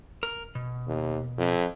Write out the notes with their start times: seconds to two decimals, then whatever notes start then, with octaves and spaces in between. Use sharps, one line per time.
0.23 A#4
0.55 B2
0.87 D#2
1.38 F2